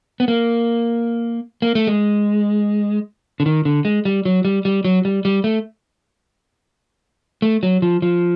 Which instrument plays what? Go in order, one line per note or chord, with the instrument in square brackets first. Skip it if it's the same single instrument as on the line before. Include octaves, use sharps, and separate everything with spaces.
[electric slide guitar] B3
A#3
A#3
A3
G#3
D3
D#3
D3
G#3
G3
F#3
G3
G3
F#3
G3
G3
A3
A3
F#3
F3
F3